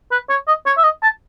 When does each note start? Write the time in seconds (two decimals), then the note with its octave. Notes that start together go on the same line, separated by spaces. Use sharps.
0.11 B4
0.29 C#5
0.47 D#5
0.66 C#5
0.77 E5
0.84 D#5
1.03 A5